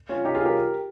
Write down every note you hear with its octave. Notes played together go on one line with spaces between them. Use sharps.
C#4 F4
D#4 G4
F4 G#4
G4 A#4